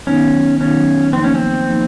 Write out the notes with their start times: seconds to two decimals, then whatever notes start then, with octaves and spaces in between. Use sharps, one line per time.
0.07 D#3 F#3 B3 C#4 D#4
0.60 D#3 F#3 B3 C#4 D#4
1.13 F3 A#3 C4 D#4
1.24 C#4
1.35 C4
1.66 F3 A#3 D#4